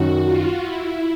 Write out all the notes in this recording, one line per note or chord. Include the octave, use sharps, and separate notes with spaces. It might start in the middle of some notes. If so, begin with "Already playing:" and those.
Already playing: F#2 D#3 F#3 F#4
F4
E4